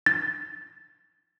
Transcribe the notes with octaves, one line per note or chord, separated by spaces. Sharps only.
A6